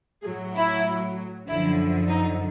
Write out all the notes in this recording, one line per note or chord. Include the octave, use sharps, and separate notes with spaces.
A2 F#3 G#4
E4
F#2 D3 F3 E4
D#4